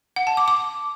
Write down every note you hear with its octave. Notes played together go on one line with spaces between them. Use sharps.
F#5
A5
D6
D6